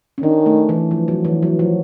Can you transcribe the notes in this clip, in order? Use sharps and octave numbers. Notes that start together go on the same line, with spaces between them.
C#4
D#3 D4
A3
E3
F3
F#3
E3
F#3
F3